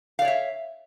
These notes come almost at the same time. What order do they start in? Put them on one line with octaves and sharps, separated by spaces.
F5 D5 C#5 E5